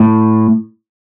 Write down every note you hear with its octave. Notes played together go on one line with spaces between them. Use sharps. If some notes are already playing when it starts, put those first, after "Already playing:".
Already playing: A2